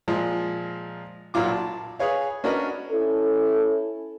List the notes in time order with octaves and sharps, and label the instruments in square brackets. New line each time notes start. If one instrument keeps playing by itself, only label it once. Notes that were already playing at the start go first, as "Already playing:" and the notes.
[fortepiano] A#2 F3 G#3
B1 A#2 F#3 F4 D6
A5
G#4 B4 C#5 F5
C#4 D4 F#4 A#4 B4 D#5
[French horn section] C#4 E4 A4